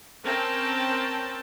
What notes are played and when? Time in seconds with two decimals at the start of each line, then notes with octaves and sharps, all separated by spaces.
0.24 C4 C#4 A#4 G5 A5